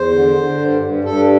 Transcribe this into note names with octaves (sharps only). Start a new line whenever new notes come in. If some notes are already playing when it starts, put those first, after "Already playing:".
Already playing: E2 C5
D3
D3
G2
G2
G2 A4